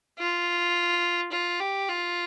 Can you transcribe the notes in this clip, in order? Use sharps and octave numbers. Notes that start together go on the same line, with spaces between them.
F4
F4
G4
F4